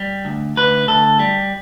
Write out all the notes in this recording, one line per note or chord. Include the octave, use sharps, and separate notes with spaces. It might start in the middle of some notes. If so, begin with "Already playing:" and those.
Already playing: G3
D2
D2 B4
D2 A4
G3